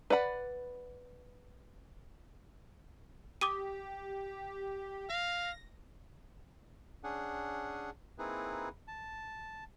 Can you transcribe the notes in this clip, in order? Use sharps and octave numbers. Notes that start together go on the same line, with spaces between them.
B4 D5 F#5 B5
G4 D6 D#6 D#7
F5 A#6
C#4 D4 G#4 F#5
A#3 C4 D#4 E4 G#4 B4
A5